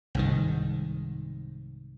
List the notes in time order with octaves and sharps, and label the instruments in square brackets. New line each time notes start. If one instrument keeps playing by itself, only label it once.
[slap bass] C2 G#2 D#3